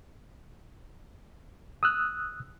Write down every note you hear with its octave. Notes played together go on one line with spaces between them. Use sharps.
D#6 E6 F#6